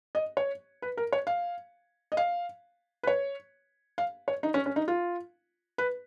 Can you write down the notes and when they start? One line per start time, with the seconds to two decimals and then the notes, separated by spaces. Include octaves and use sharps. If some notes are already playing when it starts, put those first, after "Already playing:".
0.15 D#5
0.37 C#5
0.82 B4
0.97 A#4
1.12 C#5
1.27 F5
2.12 D#5
2.17 F5
3.03 B4
3.07 C#5
3.98 F5
4.28 C#5
4.43 D#4
4.54 C#4
4.66 C#4
4.76 D#4
4.88 F4
5.78 B4